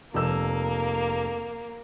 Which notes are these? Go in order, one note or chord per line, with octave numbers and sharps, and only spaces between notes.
F1 A#3 E6